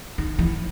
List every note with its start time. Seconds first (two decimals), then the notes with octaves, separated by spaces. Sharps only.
0.18 D#3
0.39 E3